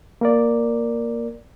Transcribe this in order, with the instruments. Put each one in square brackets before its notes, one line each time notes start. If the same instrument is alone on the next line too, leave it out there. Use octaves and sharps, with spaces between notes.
[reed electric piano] A#3 A#4 D5